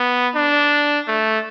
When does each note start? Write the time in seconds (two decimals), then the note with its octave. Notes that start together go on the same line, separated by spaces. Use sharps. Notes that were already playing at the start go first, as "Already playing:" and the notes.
Already playing: B3
0.36 D4
1.08 A3